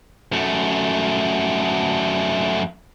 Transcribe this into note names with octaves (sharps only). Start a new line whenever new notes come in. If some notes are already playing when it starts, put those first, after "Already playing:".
F#2 A3